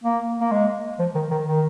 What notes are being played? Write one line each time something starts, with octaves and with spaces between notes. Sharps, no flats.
A#3
A#3
G#3
F3
D#3
D#3
D#3